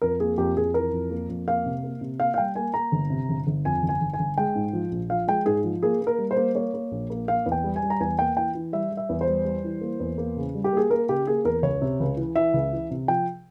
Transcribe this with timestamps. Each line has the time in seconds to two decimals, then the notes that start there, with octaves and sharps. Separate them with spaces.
0.02 F2 A#4
0.20 A#3 G#4
0.38 F2 G4
0.56 F2 G#4
0.74 E3 A#4
0.92 F2
1.10 A#3
1.29 F2
1.48 A#3 F5
1.65 C3
1.83 A#3
2.01 C3
2.20 A#3 F5
2.34 F5
2.38 G3 G5
2.55 A#3 G#5
2.74 A#3 A#5
2.92 G1
3.10 C3
3.29 G1
3.47 G1
3.65 F2 G#5
3.82 G1
3.89 G#5
4.01 G1
4.14 G#5
4.19 G1
4.37 G#3 G5
4.55 G#2
4.73 F3
4.91 A#1
5.10 F3 F5
5.27 G#3 G5
5.46 G#2 G#4
5.64 F3
5.83 A#3 G#4
6.01 A#3
6.07 A#4
6.18 G3
6.31 C5
6.37 A#3
6.55 A#3 C#5
6.74 A#3
6.91 A#1
7.10 A#3
7.28 A#3 F5
7.46 E2
7.52 G5
7.64 G3
7.76 G#5
7.83 G3
7.90 A#5
8.00 E2 G#5
8.19 A#3 G5
8.37 E3 G5
8.55 E3
8.73 G3 E5
8.91 G3
8.97 E5
9.09 E2
9.21 C5
9.27 G3
9.45 G3
9.64 E3
9.81 A#3
10.00 E2
10.18 A#3
10.37 C#3
10.55 G3
10.64 G4
10.73 A#3 G#4
10.90 A#3 A#4
11.09 C#3 G4
11.27 A#3 G#4
11.44 E2 A#4
11.63 C#2 C#5
11.82 C3
12.00 C#2
12.17 E3
12.36 E3 E5
12.54 C#2
12.73 E3
12.91 C3
13.08 F3 G5